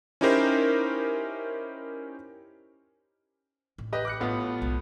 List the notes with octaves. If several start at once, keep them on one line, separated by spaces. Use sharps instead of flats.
C#4 D#4 E4 G4 A#4 C5
A1
G4 B4 D#5
D6 F#6 C#7
A2 B3 F4
B1 G#3